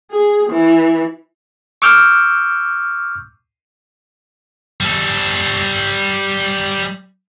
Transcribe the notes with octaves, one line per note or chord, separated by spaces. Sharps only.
G#4
E3
C#6 D6 E6 F6 G6
G3 A4